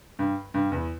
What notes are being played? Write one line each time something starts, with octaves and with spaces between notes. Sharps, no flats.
G2
G2
E2